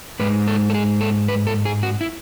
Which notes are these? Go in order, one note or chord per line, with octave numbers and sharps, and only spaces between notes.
G#2 G#3 B4
A4
A4
G#4
A4
B4
A4
G#4
F#4
E4